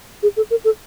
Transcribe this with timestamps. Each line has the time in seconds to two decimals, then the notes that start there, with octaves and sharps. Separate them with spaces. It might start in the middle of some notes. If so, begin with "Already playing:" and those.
0.23 G#4
0.37 A4
0.50 A#4
0.65 A4